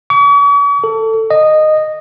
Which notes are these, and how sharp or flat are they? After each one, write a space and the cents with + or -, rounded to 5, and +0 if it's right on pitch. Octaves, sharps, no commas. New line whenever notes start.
C#6 +45
A4 +15
D#5 -10